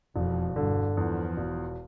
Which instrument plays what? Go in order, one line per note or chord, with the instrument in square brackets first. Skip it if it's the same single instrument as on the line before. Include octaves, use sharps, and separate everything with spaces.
[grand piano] E1 [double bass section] F2
[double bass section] G2 [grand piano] D3
[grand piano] E2 [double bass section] F3
[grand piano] E1